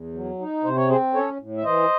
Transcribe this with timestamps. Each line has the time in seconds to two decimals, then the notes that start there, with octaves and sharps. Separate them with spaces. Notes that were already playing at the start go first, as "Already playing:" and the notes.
Already playing: E2
0.14 F#3
0.39 D#4
0.64 C3 C5
0.76 C#5
0.89 C4 G#4 C5
1.14 C#4 A4 C#5
1.40 A2
1.57 E5
1.64 E3 C5 D#5